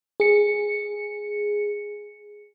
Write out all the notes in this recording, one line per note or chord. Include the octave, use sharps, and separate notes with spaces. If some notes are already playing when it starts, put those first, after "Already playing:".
G#4 C#7